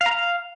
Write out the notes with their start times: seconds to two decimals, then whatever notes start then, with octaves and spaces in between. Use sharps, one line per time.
0.01 F5
0.06 A#5
0.11 F5